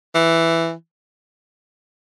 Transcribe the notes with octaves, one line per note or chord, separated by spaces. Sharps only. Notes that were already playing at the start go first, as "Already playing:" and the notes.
E3